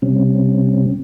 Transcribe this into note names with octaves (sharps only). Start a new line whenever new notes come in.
C3 G3 C4 C#4